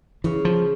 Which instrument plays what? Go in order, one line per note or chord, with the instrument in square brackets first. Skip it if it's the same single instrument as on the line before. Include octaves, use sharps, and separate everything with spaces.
[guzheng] C#3 [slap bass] E3
[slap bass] F3